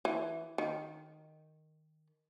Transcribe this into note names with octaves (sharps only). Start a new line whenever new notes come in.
E3
D#3